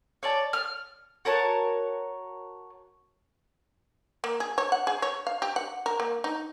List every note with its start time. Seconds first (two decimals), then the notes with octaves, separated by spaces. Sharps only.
0.23 C#5 D5 A5
0.53 F6
1.25 F#4 A#4 C#5 A5
4.24 A#3
4.40 G#4
4.58 C#5
4.72 F#5
4.87 G#4
5.02 C#5
5.27 F5
5.42 G4
5.56 F#5
5.86 A#4
6.00 A#3
6.24 D#4